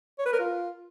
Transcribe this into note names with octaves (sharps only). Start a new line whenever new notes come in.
C#5
B4
A#4
F4